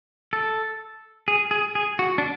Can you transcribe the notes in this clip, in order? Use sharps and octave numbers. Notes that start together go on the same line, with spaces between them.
A4
G#4
G#4
G#4
F#4
D4